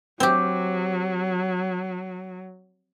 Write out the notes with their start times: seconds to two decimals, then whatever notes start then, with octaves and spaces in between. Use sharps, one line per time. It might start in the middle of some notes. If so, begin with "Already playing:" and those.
0.20 F#3 C4 G4